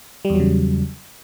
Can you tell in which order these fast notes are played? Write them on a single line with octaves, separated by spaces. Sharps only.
G3 E2 F#3 C#3